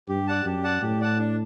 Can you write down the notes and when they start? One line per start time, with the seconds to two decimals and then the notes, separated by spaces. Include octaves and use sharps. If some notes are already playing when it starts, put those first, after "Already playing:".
0.09 G2 G4
0.27 D5 F#5 A5
0.45 F#2 G4
0.64 D5 F#5 A5
0.82 A2 G4
1.00 D5 F#5 A5
1.18 D4